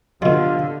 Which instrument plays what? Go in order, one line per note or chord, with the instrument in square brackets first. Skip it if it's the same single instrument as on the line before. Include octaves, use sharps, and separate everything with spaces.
[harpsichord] B2 F#3 [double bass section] D3 [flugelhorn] F4 [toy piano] G4 D#5